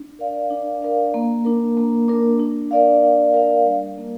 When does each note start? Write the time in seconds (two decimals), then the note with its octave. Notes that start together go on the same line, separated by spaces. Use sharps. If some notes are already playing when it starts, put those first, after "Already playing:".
Already playing: D4
0.19 A#4 D5 F5
0.51 D4
0.82 A#4 D5 F5
1.14 A#3
1.45 D4 A#4
1.77 A#3
2.08 D4 A#4
2.39 D4
2.71 A#4 D5 F5
3.03 D4
3.34 A#4 D5 F5
3.66 G3
3.97 A#3 D4 A#4